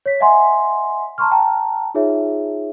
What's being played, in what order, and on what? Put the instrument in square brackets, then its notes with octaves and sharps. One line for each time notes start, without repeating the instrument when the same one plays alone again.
[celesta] C#5 B6
D#5 E5 F#5 G#5 C6
A5 A#5 C6 C#6 F6
G5 A5 A#5
D#4 F4 G#4 C#5 E5